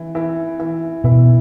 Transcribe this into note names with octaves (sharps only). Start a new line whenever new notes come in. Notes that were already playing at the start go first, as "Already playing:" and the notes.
Already playing: E3
E3
E3
B2 E3